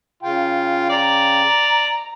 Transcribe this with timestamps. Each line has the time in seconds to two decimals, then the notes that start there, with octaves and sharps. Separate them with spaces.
0.23 C#3 F4 G5
0.90 D5 A#5